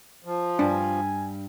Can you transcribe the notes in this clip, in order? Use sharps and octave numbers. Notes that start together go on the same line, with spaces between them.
F3
G2 D4 G#5